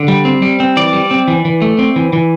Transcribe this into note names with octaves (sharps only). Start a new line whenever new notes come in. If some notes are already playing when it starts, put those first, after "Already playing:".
Already playing: D3
G3
C4
G3
C4
E3 D5
G3
C4
E3
E3
A3
C4
E3
E3